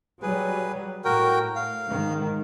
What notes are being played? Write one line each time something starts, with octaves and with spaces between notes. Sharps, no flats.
F#3 G3 G#4 B4
A2 F#4 A#4 G5
F5
G#2 D#3